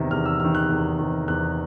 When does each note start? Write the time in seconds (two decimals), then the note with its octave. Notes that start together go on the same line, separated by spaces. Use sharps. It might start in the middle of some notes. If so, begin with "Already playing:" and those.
Already playing: E2 C3 D#3
0.10 E2 F6
0.25 E6
0.40 C3 D#3 F6
0.55 F#6
0.69 E2
0.99 C3 D#3
1.28 E2 F#6